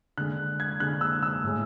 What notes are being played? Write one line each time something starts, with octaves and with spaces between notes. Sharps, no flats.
D3 G#3 F#6
G#6
D3 G#3 F#6
E6
E6
A2 G#3